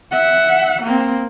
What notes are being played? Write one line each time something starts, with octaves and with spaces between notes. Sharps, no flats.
E5 F#5
A#3 C4